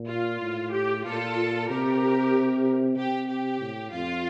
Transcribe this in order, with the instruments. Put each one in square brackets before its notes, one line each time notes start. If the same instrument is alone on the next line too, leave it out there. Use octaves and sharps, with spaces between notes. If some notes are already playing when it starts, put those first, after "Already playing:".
Already playing: [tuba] A#2
[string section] F4
[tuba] A2
[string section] G4
[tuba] A#2 [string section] F4 A4
[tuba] C3 [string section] G4 A#4
[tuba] C3 [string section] G4
[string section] G4
[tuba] A2
[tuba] F2 [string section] F4